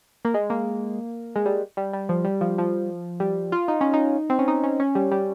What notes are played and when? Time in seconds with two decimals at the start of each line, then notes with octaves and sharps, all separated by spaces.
0.25 A#3
0.34 G#3
0.50 A#3
1.36 G#3
1.46 G3
1.77 G3
1.93 G3
2.09 F3
2.25 G3
2.41 F3
2.58 F3
3.20 G3
3.52 F4
3.68 D#4
3.81 C#4
3.93 D#4
4.30 C4
4.39 C#4
4.48 D#4
4.64 C#4
4.80 C#4
4.95 G3
5.11 G3